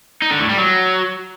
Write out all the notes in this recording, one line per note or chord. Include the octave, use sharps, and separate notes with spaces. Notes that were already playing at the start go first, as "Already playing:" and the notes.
D#4
D3
A2
G3
F#3